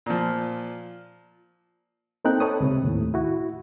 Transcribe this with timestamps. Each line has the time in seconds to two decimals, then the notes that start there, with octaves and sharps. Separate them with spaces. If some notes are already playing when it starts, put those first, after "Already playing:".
0.06 A#2 F3
2.25 A#3 C4 D#4 A4 G5 F#6
2.40 A4 B4 C#5 D#6
2.60 C#2 C3
2.84 D#2 A2
3.14 E4 F#4